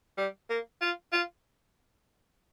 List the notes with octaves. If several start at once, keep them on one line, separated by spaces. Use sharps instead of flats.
G3
A#3
F4
F4